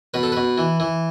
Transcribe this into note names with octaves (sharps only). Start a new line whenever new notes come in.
B2 B4
A4
B2 B4
E3
E3